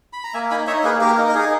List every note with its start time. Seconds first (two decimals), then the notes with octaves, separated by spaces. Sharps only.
0.13 B5
0.24 A#5
0.34 A#3 E5 G#5
0.50 D#4 G#5 B5
0.67 D#4 C#5 E5
0.84 A#3 G#4 B4
1.01 A#3 G4 A#4
1.18 D#4
1.29 A#4
1.35 D#4 G#4